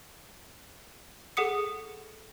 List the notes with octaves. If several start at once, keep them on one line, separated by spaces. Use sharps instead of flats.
G#4 A4 F#5 D#6 C#7